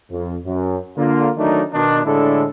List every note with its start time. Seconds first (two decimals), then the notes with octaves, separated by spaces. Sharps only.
0.10 F2
0.45 F#2
0.98 D3 A#3 F4
1.37 D#3 F#3 A3 D4 D#4
1.73 B2 D#3 D4
2.05 A2 D3 G#3 D4 E4 A4